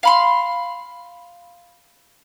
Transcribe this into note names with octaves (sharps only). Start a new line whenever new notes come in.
F5 B5 C6